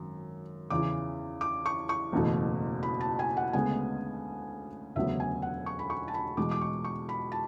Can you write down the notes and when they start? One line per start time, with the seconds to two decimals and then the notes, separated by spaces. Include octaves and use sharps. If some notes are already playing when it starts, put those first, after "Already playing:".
Already playing: G#1 F#2
0.70 E2 C#3 E3 D6
1.41 D6
1.66 C#6
1.89 C#6
2.12 F#1 E2 B2 A3
2.83 B5
3.01 A5
3.19 G#5
3.37 F#5
3.53 D2 C#3 G#3 B3 G#5
4.95 E1 D2 C#3 F#3 B3 E5
5.20 G#5
5.42 F#5
5.66 C#6
5.79 B5
5.90 C#6
6.08 A5
6.14 B5
6.37 E2 B2 G#3 D6
6.51 D6
6.61 C#6
6.84 C#6
7.09 B5
7.32 A5